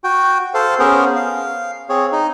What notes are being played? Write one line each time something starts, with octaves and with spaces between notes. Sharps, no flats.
F#4 G5
A4 C5 F5
B3 C#4 G#4 A#4 C5
F5
C4 G#4 C#5
D#4